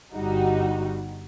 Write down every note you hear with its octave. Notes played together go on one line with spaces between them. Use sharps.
G1 G3 D#4 F#4